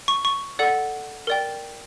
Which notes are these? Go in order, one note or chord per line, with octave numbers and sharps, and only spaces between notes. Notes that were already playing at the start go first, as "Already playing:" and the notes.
C#6
C#6
A4 D5 F#5
A#4 D5 G5